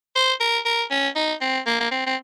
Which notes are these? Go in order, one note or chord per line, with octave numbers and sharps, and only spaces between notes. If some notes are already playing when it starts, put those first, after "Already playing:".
C5
A#4
A#4
C#4
D#4
C4
A#3
A#3
C4
C4